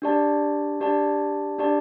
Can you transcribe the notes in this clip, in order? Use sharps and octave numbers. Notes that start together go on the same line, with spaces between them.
D4 G4 D5 A5
D4 G4 D5 A5
D4 G4 D5 A5